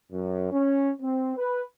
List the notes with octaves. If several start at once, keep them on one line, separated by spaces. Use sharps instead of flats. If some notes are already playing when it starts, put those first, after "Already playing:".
F#2
C#4
C4
B4